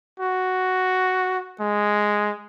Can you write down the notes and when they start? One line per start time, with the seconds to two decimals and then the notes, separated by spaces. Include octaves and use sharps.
0.20 F#4
1.60 G#3